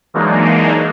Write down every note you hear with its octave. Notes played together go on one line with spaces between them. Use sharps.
E3 F#3 G#3 A#3 D4 D#4